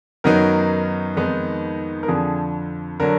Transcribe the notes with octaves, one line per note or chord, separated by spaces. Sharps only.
F#2 D#3 F#3 B3 D#4 A#4
F2 D#3 G#3 B3 D#4
A#4
F2 D3 F3 G#4
D3 F#3 A#4